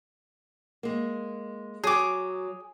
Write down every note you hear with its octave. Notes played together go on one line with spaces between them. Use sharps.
G#3 A#3
F#3 G#4 D6